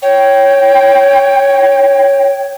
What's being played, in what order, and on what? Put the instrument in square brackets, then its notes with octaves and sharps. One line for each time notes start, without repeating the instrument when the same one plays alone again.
[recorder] C#5 [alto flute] G5